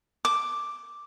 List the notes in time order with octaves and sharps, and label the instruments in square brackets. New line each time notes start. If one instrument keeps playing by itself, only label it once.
[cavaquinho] D6